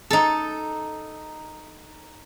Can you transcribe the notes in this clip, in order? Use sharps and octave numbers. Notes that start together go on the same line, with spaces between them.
D#4 A4